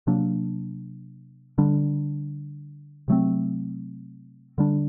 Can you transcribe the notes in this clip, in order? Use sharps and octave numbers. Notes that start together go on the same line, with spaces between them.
C3 F#3 A#3 D4
D3 G3 D4
C3 F#3 A3 C4
D3 G3 D4